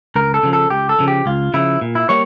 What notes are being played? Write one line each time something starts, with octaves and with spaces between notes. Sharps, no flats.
C#2 A#4
A4
C#3 F3
A4
C#2 G4
A4
C#3 F3
G4
C#2 F4
C#3 F3 E4
A#2
E4
G3 A#3 C#5